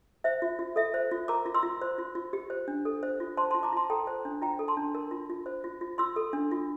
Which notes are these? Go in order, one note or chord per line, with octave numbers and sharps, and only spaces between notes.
C5 E5
F4
F4
A4 E5
C5
F4
A#4 A#5 D6
F4
C6 E6
F4
C5
F4
F4
G4
C5
D4
A4
C5
F4
C5 A5 C6
A5 C6
F4
A#5 D6
F4 A5 C6
A4 G5 A#5
C5
D4
F4 G5 A#5
A4
A5 C6
D4
A#4
F4
F4
C5
F4
F4
F4 C6 E6
A4
D4
F4